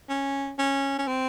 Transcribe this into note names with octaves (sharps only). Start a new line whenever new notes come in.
C#4
C#4
C#4
C4